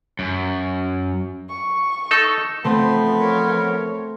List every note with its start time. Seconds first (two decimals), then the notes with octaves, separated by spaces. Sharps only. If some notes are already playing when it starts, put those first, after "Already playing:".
0.19 F#2
1.49 C#6
2.11 D#4 A4
2.64 F3 A3 B3 C4
3.20 A#4 C#5